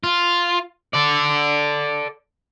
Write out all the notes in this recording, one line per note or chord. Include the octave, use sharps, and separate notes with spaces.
F4
A4 D5